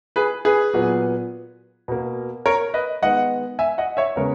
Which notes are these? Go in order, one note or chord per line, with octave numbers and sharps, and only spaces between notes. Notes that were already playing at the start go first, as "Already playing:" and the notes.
G#4 B4
G#4 B4
A#2 F#3 B3
B2 A#3
A#4 C#5
B4 D#5
D#3 G#3 B3 D#5 F#5
E5 G#5
D#5 F#5
C#5 E5
C#3 G#3 B3 A#4 C#5